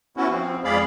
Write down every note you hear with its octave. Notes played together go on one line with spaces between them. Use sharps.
B3 C#4 E4 F#4
F3 C4
F2 G#3 G#4 D5 F5 B5